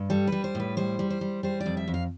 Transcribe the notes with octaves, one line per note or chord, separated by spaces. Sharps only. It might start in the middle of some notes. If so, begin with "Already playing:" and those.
Already playing: G2
G3 A4
G3 B4
C5
A2 B4
G3 C5
G3
C5
G3
G3 C5
D5
F2
E5
F2
F5